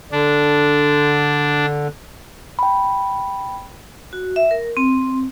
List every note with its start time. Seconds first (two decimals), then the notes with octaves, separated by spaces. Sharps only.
0.12 D3 D4
2.59 G5 B5
4.13 F#4
4.36 E5
4.51 A#4
4.77 C4